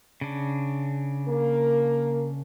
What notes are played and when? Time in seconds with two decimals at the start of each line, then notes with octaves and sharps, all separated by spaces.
0.21 C#3 D4
1.28 A#3 A#4